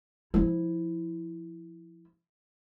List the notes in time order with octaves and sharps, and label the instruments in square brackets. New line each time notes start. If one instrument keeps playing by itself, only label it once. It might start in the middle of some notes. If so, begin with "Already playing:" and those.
[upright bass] F3 E4